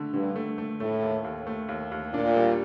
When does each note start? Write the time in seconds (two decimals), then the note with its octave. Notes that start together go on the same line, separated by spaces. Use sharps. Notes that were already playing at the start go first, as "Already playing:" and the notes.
Already playing: D3 A3
0.13 G2 D3
0.36 A3
0.58 A3
0.80 A2 A3
1.02 D#2
1.24 D#2
1.47 A3
1.69 D#2
1.92 D#2
2.14 A#2 D4
2.36 G3